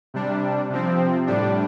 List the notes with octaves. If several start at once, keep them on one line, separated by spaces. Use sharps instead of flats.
C3 G3 D4
C3 F3 C4
A2 G3 D4